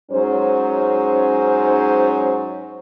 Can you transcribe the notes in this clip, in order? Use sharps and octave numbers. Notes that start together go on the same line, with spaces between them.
G#2 F#3 C#4 C5